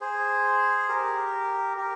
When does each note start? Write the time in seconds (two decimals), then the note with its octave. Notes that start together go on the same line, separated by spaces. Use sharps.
0.01 G#4 C5
0.89 G4 A#4
1.77 G4 A#4